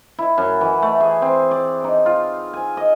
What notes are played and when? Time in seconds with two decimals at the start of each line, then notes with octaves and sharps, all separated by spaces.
0.19 E4
0.38 F#2
0.61 E3
0.82 A3
1.01 G#4
1.22 C4
1.51 D5
1.84 D#4
2.06 F4
2.53 G#5
2.77 D#5